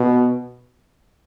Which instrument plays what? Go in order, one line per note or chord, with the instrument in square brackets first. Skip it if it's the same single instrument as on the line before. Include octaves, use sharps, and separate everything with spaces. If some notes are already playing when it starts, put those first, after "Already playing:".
Already playing: [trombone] B2